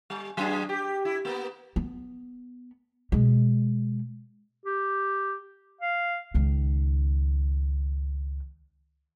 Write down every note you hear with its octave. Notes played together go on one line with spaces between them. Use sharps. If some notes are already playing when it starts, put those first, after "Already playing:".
G3
F#3 D4 G#4
G4
E4
A#3 B3
B3
B2 G#3
G4
F5
C#2 D#3